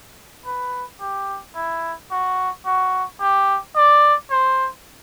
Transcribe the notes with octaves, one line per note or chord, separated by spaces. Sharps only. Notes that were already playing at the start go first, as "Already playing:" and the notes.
B4
G4
E4
F#4
F#4
G4
D5
C5